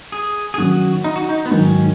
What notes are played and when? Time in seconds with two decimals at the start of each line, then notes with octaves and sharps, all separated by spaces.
0.12 G#4
0.54 G#4
0.58 D#3 F#3 C#4 F#4
1.04 D#4
1.16 F#4
1.29 D#4
1.46 B3
1.51 G#2 D#3 F#3 C#4 D#4